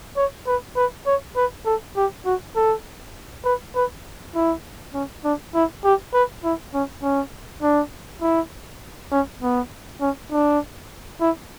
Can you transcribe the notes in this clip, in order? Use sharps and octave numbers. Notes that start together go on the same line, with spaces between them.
C#5
B4
B4
C#5
B4
A4
G4
F#4
A4
B4
B4
E4
C#4
D4
E4
G4
B4
E4
C#4
C#4
D4
E4
C#4
B3
C#4
D4
E4